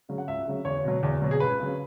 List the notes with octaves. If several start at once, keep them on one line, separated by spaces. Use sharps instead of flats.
C#3 F#3
F#5
C#2 E5
C#3 F#3
E2 C#5
B2 F#3
E2
B2 F#3
G#4
C#2 B4
C#3 F#3